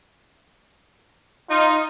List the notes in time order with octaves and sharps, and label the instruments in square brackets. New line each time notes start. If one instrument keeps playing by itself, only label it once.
[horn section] D#4 [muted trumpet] F4